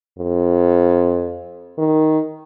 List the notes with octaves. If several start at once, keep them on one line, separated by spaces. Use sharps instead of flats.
F2
D#3